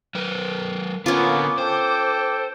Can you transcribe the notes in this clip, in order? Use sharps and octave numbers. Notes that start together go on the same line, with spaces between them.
F#3 A#4 B4
D3 A#3 B3 C#4 F4 F5 D6
A4 C5 G5